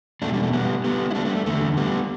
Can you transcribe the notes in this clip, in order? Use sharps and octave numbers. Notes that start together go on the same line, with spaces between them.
E2 B2 A3 D4
G3
A3
G3 B3
G3 B3
E4
A3 D4
G3 B3
A3
E2 D3 A3
G3 B3